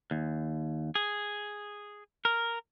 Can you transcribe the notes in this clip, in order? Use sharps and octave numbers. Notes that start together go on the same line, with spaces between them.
D#2
G#4
A#4